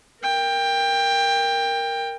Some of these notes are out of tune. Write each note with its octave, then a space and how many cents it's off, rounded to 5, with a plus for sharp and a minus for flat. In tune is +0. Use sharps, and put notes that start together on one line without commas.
A#4 +0 G5 +20